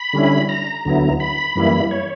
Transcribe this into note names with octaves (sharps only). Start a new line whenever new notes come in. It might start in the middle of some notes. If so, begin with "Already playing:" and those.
Already playing: B5
D3 G3 C#4 E4
A#5
D2 D3 F#3 B3 E4
B5
F#2 E3 G3 A#3 E4
C#5